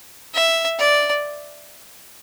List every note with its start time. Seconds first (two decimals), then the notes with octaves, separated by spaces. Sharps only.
0.34 E5
0.79 D5